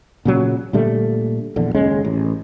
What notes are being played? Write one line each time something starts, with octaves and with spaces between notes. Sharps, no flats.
A#2 C#3 F#3
A#2 D3 G3 A3
A#1 E2 D3
F#1 D#2 G#3 C#4
A1